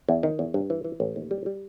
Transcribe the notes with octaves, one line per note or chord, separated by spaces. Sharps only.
E2
D#3
E2
G2
E3
E3
A1
D#2
G3
G3